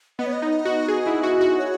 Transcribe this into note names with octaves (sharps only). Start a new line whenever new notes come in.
B3 D#5
C#5
D#5
D#4
F#4
G#4
E4
F#4
F#4
C#5